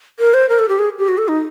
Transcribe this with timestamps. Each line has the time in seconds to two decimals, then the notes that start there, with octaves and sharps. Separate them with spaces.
0.20 A#4
0.34 C5
0.49 A#4
0.59 A4
0.69 G4
0.79 G#4
0.98 G4
1.08 F#4
1.18 A4
1.28 D#4